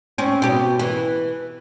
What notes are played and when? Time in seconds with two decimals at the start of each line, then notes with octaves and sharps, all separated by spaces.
0.18 C4 C#4
0.42 B2 G4
0.79 E3